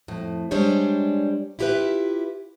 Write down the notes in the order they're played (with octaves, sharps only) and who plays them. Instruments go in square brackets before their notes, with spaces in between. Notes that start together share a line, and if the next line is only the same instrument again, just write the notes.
[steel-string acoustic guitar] F2 A2
G3 G#3 D4 C5 C#5
E4 F4 G4 A4 B4 E5